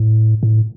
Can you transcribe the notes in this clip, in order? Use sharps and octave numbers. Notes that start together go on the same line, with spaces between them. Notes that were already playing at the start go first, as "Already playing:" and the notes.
Already playing: A2
A2